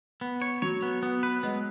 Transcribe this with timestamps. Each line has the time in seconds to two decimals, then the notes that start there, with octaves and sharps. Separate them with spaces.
0.21 B3
0.42 C#5
0.62 F#3 C#5
0.83 B3
1.03 B3
1.23 B4
1.43 G#3 B3